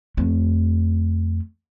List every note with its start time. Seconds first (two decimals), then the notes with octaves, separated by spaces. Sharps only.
0.17 F2 A3